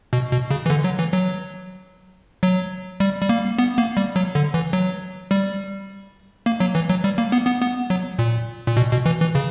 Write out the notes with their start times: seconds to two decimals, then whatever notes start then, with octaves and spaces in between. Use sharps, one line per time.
0.13 B2
0.32 B2
0.51 C#3
0.66 E3
0.70 D3
0.84 F#3
0.99 E3
1.13 F#3
2.43 F#3
3.00 G3
3.21 G3
3.29 A#3
3.58 B3
3.78 A#3
3.97 G3
4.16 F#3
4.35 D3
4.54 E3
4.73 F#3
5.31 G3
6.46 A#3
6.60 F#3
6.75 E3
6.90 F#3
7.04 G3
7.18 A#3
7.32 B3
7.47 B3
7.62 B3
7.90 F#3
8.19 A#2
8.67 A#2
8.77 B2
8.92 B2
9.06 E3
9.20 E3
9.35 C#3